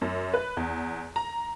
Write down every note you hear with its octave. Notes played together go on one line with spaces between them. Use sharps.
F#2
B4
E2
A#5